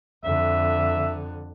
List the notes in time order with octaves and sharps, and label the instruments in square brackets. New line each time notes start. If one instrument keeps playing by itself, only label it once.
[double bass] F2 D3 [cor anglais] E5